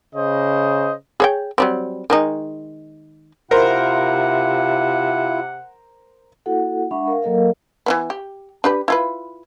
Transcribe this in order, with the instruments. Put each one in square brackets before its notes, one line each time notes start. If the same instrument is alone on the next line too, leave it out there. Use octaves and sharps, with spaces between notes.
[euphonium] C#3 [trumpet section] C5 D#5
[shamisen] G#4 C#5 G5
F#3 G3 C4
D#3 G#3 D#4
[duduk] C3 [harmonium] E4 F4 [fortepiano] A#4 C5 [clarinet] F#5
[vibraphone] A#3 E4 F#4 A4 F#5
G#3 D4 E5 F#5 B5 C#6
A#4 F5
F#3 A#3 A4 A#4 D#5 F5
[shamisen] E3 F3 B3
G4
D4 G4 B4
E4 F4 B4